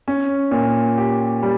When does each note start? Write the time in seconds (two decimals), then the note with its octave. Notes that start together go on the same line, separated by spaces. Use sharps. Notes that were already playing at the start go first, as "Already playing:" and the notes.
0.08 C#4
0.51 A#2
0.98 G4
1.43 G3